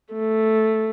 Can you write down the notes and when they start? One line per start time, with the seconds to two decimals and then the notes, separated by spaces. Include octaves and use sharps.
0.13 A3